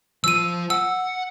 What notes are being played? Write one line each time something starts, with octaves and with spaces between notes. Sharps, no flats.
F3 F4 E6 D#7
F#5 E6